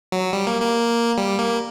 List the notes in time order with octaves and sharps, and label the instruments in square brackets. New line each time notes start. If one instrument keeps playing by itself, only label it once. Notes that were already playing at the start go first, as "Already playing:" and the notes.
[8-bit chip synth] F#3
G3
A#3
A#3
G3
A#3